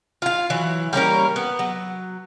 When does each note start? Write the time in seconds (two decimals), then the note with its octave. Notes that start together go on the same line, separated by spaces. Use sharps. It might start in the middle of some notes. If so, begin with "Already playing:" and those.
0.22 F4 F5
0.50 E3 F#3
0.93 G3 A#3 C#4 A#4
1.36 B3
1.59 F#3